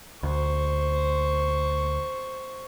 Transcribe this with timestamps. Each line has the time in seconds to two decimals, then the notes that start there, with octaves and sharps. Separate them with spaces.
0.23 D2 C5 C#6